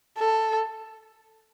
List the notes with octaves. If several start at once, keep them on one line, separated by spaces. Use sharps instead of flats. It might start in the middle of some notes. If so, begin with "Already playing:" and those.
A4